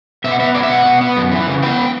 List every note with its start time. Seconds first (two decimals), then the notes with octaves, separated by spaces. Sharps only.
0.24 B2 E5
0.32 F#5
0.39 B3 E5
0.54 F#3 D5
0.63 E5
0.70 B2 F#5
0.85 B2
1.01 B3
1.17 F#2
1.32 E3
1.47 C#3
1.63 B3 G5